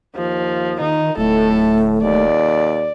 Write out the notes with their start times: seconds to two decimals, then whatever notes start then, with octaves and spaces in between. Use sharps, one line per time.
0.16 D#2 F3
0.80 D#3 D#4
1.17 D1 A2 A3 A4
2.02 D#2 D5